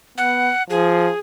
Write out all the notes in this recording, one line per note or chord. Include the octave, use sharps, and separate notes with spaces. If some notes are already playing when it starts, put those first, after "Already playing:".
B3 F#5
F3 G#4